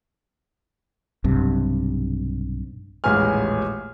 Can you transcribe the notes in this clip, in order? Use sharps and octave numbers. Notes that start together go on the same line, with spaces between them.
B1 G2 C3
D#1 A1 G#3 B4 G#5 F6